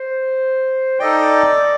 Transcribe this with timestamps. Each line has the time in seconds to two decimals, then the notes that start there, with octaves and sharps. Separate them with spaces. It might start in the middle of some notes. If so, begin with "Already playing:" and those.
Already playing: C5
1.00 D#4 A4 D5 D#5 G5